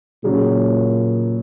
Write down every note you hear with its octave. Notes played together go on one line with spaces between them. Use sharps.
A#2 C#3 F#3 C#4 G#4